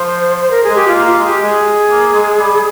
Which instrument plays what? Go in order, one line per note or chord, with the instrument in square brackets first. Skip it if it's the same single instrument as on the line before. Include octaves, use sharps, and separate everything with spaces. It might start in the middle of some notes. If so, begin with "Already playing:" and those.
Already playing: [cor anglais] F3 [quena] C5
[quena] C5
A#4
G#4
[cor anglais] G#3
[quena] G4
F4
[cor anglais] A#3
[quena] F4
[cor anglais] G#3
[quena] G4
[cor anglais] G#3 [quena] G#4
[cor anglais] A#3
G#3
G3